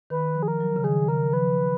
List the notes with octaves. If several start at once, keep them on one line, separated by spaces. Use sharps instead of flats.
D#3 B4
F3
G#4
A#4
F#3
C#3
D#3 G#4
C#3 A#4
F3 B4